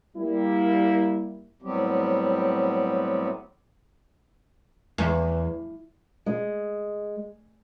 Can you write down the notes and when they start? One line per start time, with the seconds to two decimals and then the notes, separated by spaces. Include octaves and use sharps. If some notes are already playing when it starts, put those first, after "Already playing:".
0.17 G3 A#3 E4
1.62 A2 F#3 G3 B3 C4 G4
4.98 E2
6.26 G#3